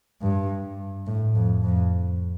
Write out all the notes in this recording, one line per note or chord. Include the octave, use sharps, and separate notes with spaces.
G2
A2
F2
F2